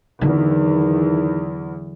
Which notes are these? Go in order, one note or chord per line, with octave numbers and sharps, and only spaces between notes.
E2 D3 D#3 F#3